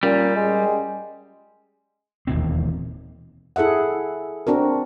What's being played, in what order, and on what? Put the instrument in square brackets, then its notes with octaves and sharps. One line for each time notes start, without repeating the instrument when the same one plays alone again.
[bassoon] A#2 [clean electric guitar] G3 [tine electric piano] C#4
[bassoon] G#3
[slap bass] E1 D#2 A#2 C4
[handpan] E4 G#4 A4 E5 F#5
C4 D4 F#4 A#4